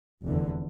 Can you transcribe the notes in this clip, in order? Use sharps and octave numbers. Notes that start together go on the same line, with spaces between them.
F1 E2 D3